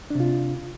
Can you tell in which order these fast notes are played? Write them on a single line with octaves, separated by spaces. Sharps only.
D4 C3 F4